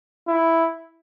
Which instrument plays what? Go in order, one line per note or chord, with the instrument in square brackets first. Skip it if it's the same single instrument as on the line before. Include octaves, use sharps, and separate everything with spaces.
[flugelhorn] E4